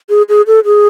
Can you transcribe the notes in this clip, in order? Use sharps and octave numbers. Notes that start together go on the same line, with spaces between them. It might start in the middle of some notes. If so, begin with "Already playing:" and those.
G#4
G#4
A4
G#4